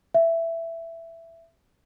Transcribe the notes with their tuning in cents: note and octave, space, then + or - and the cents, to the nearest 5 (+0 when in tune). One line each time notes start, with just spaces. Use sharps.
E5 +10